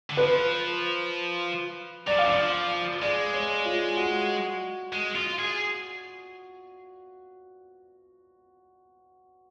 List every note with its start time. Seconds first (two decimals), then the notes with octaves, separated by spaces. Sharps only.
0.10 D3
0.17 F3 B4
2.07 F#3 D5
2.16 F3 F5
2.26 D3 D5
2.35 F3
3.02 G#3 D5
3.34 C#5
3.65 F4
3.97 F#4
4.92 G#3
5.15 F4
5.39 G#4